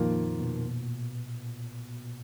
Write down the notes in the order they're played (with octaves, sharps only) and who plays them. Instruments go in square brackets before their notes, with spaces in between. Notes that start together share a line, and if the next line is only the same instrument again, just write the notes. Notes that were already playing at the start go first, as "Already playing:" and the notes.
Already playing: [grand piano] F2 D#3 A#3 F4 [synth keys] A#2
[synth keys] B2